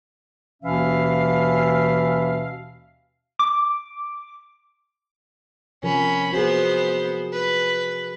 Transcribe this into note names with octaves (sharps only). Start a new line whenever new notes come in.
D#2 B2 E3 C#4 E5 F5
D6
C3 F3 C#4 A#4 B5
B3 F#4 G#4 C5
B4